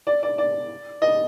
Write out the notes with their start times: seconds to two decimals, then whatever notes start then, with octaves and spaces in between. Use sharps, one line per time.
0.07 D5
0.23 D5
0.38 D5
1.02 D#5